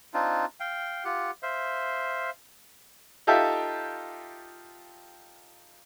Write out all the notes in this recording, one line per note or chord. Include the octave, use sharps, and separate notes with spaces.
C4 D4 D#4 F4
F5 G5
F4 G4 F#5
C5 E5 F5
D#4 F4 G4 A4 E5 G5